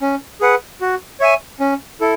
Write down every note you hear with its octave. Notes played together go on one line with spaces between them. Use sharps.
C#4
G#4 B4 F#5
F#4
C#5 E5 G#5
C#4
E4 A4